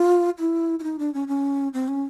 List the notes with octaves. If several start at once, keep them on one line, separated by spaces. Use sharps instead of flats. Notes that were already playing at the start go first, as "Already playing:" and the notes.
Already playing: F4
E4
E4
D#4
D4
C#4
C#4
C4
C#4